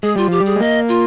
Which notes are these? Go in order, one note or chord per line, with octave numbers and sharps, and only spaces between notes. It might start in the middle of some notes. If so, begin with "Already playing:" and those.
G#3 G#4
G3 F4
F3 G4
G3
G#4
G#3
A#3 D#5
F4